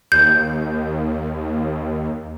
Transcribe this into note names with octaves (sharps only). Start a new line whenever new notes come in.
D#2 G6